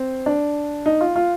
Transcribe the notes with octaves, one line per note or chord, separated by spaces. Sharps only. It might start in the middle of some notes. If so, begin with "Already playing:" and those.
Already playing: C4
D4
D#4
F4
F4